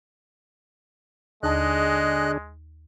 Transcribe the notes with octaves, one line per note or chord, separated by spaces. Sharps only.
D#2 D3 G#3 D4 G#4 D#5 A5 F#6